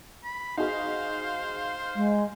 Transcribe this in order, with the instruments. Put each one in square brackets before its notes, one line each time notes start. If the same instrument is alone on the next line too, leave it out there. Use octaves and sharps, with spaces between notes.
[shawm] B5
[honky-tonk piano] D#4 F#4 G#4 [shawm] C5 [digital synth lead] F5
[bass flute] G#3